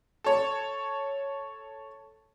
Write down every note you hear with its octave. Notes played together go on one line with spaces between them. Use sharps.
A4 C#5